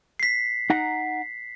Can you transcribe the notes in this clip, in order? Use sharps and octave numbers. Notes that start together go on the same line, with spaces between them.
B6 C7
D#4 F#5 A#5